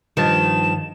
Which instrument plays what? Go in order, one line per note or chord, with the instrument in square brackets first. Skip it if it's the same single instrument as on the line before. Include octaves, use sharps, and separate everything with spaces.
[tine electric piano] G2 F3 A5 [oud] D#3 [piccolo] E7